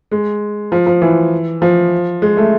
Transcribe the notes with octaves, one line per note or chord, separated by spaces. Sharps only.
G#3
F3
F3
E3
F3
G#3
A3